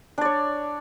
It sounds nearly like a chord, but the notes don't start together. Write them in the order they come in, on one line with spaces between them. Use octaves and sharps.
D4 D5 C#5